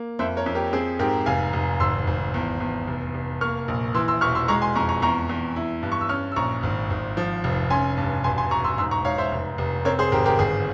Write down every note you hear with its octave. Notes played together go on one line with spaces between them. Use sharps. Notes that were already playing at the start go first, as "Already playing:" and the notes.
Already playing: A#3
F2 C5 E5
A#4 C#5
F2
G4 A#4
C4 G#4
G#2 G4 A#4
F1 F5 G#5
F1
G#1 C6 E6
G#1
E2
E2
F1
F1
A#3 C#6 F6
A#1
E3 C6 E6
C6 E6
E1 C#6 F6
C6 E6
G#3 A#5 C#6
G#5 C6
F2 A#5 C#6
A#5 C#6
E2 A#5 C#6
E2
E4
G2
C#6
E6
C#4 C#6 F6
E6
A#1 A#5 C#6
G#1
G#1
F3
F1
C#4 G#5 C6
G2
E1 G#5 C6
G#5 C6
E1 A#5 C#6
C6 E6
G#2 C6 E6
A#5 C#6
G#2 C#5 F5
C5 E5
F1
F1
C4 A#4 C#5
G#4 C5
G#1 G4 A#4
G4 A#4
G1 G#4